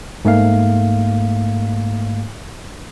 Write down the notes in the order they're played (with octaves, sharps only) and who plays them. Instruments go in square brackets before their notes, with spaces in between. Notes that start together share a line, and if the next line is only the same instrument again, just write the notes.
[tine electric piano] G#2 A3 A#3 F5